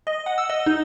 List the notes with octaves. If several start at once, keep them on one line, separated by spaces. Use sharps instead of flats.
D#5
F#5
E6
D#5
D#4